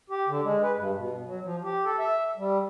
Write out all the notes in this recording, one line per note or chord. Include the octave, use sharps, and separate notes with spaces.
G4
D3
G#3
B4
G2
B2
F#3
F3
G4
A4
E5
G3